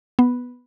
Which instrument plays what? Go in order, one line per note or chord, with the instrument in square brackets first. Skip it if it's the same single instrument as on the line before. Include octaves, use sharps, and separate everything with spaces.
[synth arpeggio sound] B3